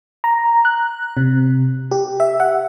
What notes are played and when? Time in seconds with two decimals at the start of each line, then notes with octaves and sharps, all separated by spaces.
0.24 A#5
0.65 F#6
1.17 C3
1.91 G4
2.20 E5
2.40 F#5